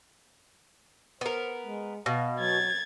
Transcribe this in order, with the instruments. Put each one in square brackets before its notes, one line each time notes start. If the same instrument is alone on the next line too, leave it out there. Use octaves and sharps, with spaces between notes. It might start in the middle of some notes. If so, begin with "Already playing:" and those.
[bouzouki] B3 A#4 [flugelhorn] C5
[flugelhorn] G#3
[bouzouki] B2 [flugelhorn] F5
[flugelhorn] F#3 [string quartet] G#6 A6